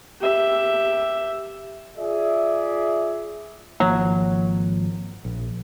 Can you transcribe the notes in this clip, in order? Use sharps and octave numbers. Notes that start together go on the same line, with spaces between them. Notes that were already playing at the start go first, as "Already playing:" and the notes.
G4 E5
F4 G#4 D5 E5
G#1 F3 F#3 A#3
A#1